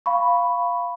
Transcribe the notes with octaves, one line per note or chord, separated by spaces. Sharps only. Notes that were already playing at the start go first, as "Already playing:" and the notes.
F5 B5 C#6